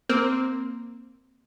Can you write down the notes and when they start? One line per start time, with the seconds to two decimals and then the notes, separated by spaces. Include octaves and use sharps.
0.09 A#3 C4